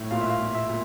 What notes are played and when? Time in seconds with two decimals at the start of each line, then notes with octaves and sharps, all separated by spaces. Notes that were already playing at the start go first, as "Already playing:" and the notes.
Already playing: A2
0.11 A#2 F5
0.21 E5
0.30 F5
0.41 A#2
0.55 E5
0.69 A#2